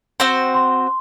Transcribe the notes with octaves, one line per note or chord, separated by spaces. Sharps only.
C4 F#4 C5
C6